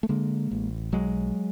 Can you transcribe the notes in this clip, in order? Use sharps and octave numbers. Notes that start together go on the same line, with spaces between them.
A3
D3 G#3 A#3
A1
B1 F#3 G#3